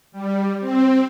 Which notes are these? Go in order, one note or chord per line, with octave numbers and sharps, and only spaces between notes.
G3
C4